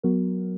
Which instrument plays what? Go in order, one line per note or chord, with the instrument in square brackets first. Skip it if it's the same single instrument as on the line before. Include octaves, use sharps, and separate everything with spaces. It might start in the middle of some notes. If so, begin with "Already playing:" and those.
[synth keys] F#3 B3 F#4 A#4